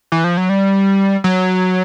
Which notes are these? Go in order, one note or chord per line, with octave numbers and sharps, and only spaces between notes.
E3
F3
F#3
G3
F#3